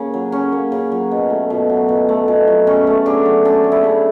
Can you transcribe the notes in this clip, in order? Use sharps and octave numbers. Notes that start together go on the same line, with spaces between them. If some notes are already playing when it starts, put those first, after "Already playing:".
Already playing: C#3 A#3
F#3
C#3 C#4
A#3
C#3
F#3
B2
A3
B2
F#3
B2
A3
B2
F#3
C#3 C#4
A3
C#3 D4
F#3
C#3 D4
A3
E4
C#3